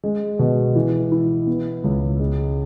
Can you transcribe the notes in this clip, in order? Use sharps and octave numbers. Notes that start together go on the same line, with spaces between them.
G#3
B2
E3
E4
B3
C#2
G#3